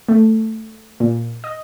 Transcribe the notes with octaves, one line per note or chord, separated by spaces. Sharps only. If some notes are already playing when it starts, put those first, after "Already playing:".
A3
A#2
D#5